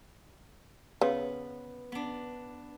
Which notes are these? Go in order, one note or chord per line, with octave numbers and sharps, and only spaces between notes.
C#3 B3 B4
B3 D4